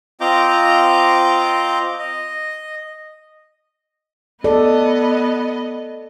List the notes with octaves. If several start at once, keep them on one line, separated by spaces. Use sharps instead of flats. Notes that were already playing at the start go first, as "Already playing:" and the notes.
C4 F4 D#5 A#5 D6 G6
D#5
B3 A4 D5 D#5